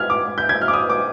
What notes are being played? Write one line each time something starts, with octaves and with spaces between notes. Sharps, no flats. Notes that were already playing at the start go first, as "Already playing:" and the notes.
Already playing: F6 G#6
D6
G6
G#6
F6
D6
D#6
D6